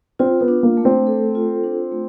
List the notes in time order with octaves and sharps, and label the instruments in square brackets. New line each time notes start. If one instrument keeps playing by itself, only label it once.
[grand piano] C4 [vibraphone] F4
[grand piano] B3
[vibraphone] D4
[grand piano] A#3
[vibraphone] A3
[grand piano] C4
[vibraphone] A4
F4
D4
A3